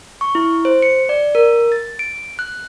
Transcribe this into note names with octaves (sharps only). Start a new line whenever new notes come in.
C#6
E4
C5
C#7
D5
A#4
A6
D7
F#6